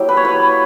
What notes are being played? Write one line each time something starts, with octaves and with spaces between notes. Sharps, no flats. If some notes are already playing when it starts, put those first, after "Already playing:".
Already playing: F#3 A#3 E4 G4
B4
C#5
B4